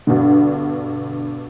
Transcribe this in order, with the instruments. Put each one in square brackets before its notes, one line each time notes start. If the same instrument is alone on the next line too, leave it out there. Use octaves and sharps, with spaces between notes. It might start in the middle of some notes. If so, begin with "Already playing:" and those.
[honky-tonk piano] G2 B2 D3